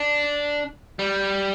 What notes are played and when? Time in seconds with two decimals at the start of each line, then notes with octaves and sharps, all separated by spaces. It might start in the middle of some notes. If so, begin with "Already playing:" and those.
Already playing: D4
0.99 G3